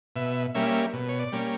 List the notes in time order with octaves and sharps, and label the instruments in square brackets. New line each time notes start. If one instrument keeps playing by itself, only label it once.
[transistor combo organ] B2 E5
G3 A#3 C#4 E5
B2
C#5
D5
G3 A#3 C#4